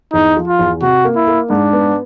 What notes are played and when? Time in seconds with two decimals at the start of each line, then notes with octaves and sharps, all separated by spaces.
0.13 E2 D#4
0.37 F3
0.48 F4
0.59 E2
0.82 C3 F#4
1.04 A#3
1.16 E4
1.27 A#3
1.50 G#2 D4
1.73 B3